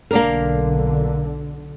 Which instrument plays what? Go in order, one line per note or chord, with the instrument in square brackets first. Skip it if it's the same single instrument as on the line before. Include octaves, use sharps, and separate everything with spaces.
[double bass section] B1 D3 [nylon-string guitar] A#3 D4 A#4